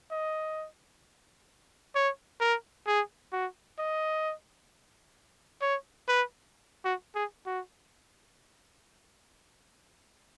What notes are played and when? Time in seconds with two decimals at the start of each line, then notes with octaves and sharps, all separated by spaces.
0.11 D#5
1.95 C#5
2.41 A#4
2.87 G#4
3.32 F#4
3.79 D#5
5.62 C#5
6.08 B4
6.85 F#4
7.15 G#4
7.46 F#4